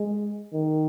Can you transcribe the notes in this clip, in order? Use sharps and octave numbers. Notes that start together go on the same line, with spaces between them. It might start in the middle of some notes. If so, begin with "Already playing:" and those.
Already playing: G#3
D#3